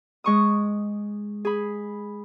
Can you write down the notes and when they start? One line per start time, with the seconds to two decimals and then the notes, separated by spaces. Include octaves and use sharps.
0.24 G#3 C#6 D#6
1.45 G#4 B5